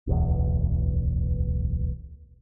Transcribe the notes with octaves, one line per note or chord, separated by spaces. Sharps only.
D1 B1 E2